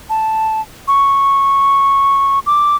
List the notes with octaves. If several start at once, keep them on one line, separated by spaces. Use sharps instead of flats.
A5
C#6
D6